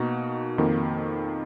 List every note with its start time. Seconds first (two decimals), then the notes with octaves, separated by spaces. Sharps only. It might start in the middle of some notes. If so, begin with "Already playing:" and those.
Already playing: B2 A#3 D#4 F#4
0.58 F2 D#3 A#3